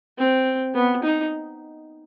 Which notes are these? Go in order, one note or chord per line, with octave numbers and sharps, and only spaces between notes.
C4
B3
D#4